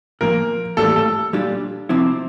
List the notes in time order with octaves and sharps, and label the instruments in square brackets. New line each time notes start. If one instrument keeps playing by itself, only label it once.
[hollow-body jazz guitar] A#2 F3 A#3 [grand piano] A#4
[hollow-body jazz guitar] A2 E3 G3 A#3 [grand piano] A4
[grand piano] A4
[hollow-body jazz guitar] A#2 G3 D4 F4
C3 F3 C4 E4